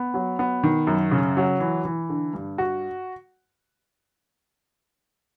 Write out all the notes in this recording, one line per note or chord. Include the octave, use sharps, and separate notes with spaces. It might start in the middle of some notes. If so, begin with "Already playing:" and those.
Already playing: B3
F#3
B3
D#3
F#2
C#3
F#3
E3
E3
D3
G2
F#4